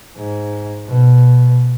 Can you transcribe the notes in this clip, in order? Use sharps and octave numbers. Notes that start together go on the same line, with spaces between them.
G#2
B2